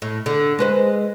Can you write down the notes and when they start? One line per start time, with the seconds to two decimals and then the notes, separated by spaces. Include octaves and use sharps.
0.02 A2
0.26 D3
0.59 G#3 B4 C5